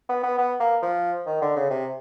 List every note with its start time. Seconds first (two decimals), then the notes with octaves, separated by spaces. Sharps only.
0.09 B3
0.23 B3
0.38 B3
0.60 A#3
0.82 F3
1.26 D#3
1.41 D3
1.56 C#3
1.70 C3